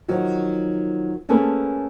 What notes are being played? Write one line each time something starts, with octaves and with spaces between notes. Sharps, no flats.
D#3 F3 F#3 F#4
A3 A#3 C#4 G#4 A4 B4